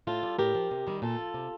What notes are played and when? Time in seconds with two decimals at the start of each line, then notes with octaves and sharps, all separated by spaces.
0.07 A2 F4 A4
0.23 G3
0.39 A2 G4 A#4
0.55 F3
0.71 C3
0.87 D#3 G3
1.02 A#2 F4 A4
1.19 F3
1.34 C3